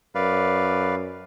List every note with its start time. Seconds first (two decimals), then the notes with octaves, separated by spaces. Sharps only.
0.15 F#2 B4 D5 F5